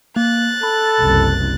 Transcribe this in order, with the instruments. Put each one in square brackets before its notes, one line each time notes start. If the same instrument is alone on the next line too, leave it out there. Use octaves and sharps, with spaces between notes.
[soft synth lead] A#3 [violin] F#6 A6
[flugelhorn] A4 [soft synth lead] B5
[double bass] F#1 C2